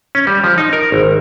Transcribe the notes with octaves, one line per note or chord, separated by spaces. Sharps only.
C#4
G3
F3
D#4
A#4
G#1